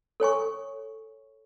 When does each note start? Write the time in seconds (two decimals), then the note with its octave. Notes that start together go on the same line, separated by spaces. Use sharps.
0.20 A4 C#5 G#5 C#6